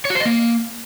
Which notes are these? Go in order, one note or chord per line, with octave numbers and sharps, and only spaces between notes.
C#5
F#4
C5
D#5
A#3